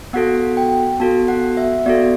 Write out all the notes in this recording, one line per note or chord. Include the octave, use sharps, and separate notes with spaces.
B3 F#4 A4 F#5
G5
B3 F#4 A4 A5
F#5
E5
B3 F#4 A4 D5